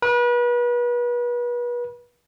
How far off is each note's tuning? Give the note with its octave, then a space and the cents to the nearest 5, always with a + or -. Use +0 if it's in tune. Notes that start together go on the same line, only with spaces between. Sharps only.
B4 -35